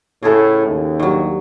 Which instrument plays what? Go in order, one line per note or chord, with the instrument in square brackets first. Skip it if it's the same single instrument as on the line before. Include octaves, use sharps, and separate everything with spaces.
[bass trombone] A2 [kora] C#3 G#4 A4
[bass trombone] D#2
[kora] G2 F#3